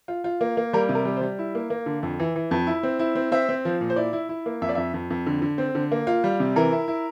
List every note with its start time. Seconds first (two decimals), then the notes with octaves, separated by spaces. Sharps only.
0.08 F4
0.24 F4
0.41 A#3
0.57 A#3
0.73 G3 A#4
0.89 C3
0.95 A#4
1.05 G3
1.17 C5
1.21 G3
1.39 E4
1.55 A#3
1.70 A#3
1.86 D3
2.03 F2
2.20 E3
2.36 E3
2.51 F2
2.67 E4
2.83 C4
2.99 E4
3.15 C4
3.32 C4 E5
3.49 C4
3.65 F3
3.81 A#2
3.90 C5
3.96 E4 D5
4.13 E4
4.29 E4
4.46 A#3
4.62 F2 E5
4.69 D5
4.75 F2 E5
4.94 F2
5.10 F2
5.26 D3
5.42 D3
5.58 C4
5.75 D3
5.92 A#3
6.07 F4
6.24 G3
6.40 C3
6.56 E3 A#4
6.72 E4
6.88 E4